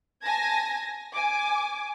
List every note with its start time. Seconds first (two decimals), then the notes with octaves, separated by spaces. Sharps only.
0.22 G#5 A5 G#6 A#6
1.13 G#5 D6